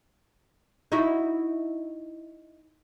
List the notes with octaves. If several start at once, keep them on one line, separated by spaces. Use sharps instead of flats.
D#4 E4 F#4